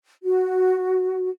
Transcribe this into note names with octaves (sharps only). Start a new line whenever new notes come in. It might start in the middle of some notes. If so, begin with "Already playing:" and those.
F#4